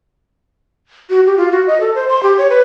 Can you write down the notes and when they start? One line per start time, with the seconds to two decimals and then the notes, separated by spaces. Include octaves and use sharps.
1.10 F#4
1.26 G4
1.37 F4
1.52 F#4
1.67 D#5
1.81 A4
1.95 C5
2.08 C6
2.23 G4
2.38 C#5
2.50 B4